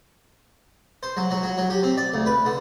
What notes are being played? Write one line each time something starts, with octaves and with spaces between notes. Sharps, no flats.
C5
F#3
F#3
F#3
F#3
G4
C4
D5
D2
B4
D3